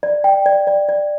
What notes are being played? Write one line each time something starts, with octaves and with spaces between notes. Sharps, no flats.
D5
G5
D5
D5
D5